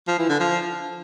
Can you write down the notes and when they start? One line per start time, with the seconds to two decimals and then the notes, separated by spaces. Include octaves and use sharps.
0.08 F3
0.19 E3
0.29 D3
0.40 F3